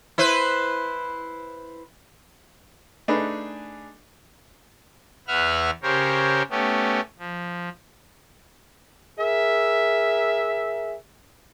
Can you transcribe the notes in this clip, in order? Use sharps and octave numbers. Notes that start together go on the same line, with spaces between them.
E4 B4 C5
A3 D4 D#4 G#4 B4
E2 B4 E5 F#5 F6
C#3 G4 A#4 C5 C#5
A3 B3 C#4 G4
F3
G#4 A#4 E5